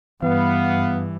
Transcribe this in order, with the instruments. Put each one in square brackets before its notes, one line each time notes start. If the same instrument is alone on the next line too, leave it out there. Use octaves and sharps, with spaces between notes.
[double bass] G2 [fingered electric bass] E3 [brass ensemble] B3 [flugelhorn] F5